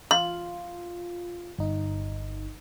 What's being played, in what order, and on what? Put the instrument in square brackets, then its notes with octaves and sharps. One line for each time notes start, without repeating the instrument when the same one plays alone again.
[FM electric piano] F4 [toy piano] C6
[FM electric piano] G1 D#4